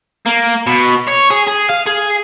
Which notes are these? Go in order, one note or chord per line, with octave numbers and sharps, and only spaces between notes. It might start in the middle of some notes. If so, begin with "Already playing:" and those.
A#3
B2
C#5
G#4
G#4
F5
G#4